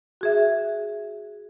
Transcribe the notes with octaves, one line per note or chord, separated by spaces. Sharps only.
F#4 G#4 E5